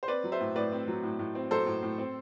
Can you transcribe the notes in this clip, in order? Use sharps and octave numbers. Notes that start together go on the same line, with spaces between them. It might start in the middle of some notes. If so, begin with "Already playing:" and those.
C5
C4 B4 D5
F#3
C5 E5
A2
A2 B4 D5
C4
F#3
A2
A2
C4
F#3 A4 C5
A2
A2
C4